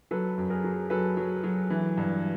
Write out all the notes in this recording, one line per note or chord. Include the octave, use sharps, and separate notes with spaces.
F#3 A4 B4
F#2
G#4 A#4
F#3
F#3 A4 B4
F#3
F#3
E3
G2